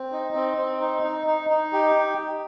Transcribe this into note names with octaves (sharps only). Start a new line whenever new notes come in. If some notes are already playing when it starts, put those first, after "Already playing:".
Already playing: C4
D#4
C4
C4
D#4
D#4
D#4
D#4
G4